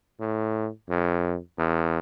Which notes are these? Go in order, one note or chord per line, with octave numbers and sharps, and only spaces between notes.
A2
F2
E2